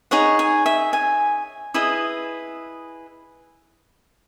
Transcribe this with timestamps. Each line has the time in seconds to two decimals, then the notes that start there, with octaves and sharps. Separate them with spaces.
0.11 D#4 G#4 C#5 F#5
0.39 G#5
0.66 E5
0.93 G#5
1.74 E4 G#4 B4 D#5